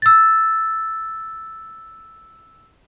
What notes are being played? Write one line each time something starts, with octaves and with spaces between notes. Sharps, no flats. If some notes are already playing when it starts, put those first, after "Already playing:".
E6 A6